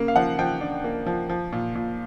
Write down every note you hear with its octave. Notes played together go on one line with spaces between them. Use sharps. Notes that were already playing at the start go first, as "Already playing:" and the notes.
Already playing: C#3 A#3
F5
F3 F#5
F3 G5
D4
A#3
F3
F3
A#2
A#2